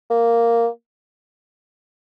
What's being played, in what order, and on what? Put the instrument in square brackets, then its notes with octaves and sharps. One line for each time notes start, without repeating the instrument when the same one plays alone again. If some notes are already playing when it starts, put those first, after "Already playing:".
[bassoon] A#3